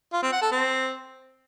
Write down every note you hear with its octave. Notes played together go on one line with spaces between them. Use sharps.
F4
C4
F#5
A4
C4